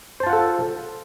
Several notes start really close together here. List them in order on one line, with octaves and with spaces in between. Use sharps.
C5 A5 F4 F#5 A4